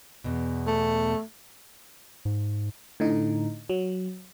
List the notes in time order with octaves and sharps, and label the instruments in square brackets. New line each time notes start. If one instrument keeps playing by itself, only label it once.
[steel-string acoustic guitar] E2 B2
[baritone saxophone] A3
[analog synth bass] G#2
[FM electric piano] A2 D3 D#4
F#3